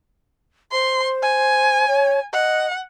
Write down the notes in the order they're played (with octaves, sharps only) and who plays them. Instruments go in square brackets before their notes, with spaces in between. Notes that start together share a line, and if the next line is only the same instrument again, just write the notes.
[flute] C5 [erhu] C6
[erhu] G#5
[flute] C#5
[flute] D#5 [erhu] F#5